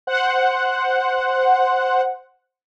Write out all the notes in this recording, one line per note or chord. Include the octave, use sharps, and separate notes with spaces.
C5 F#5